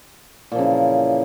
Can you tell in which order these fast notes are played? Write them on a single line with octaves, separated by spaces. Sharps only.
A#2 F3 C#3 E3